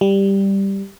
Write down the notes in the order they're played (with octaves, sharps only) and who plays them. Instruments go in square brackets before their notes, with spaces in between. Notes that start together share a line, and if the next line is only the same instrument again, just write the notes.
[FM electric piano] G3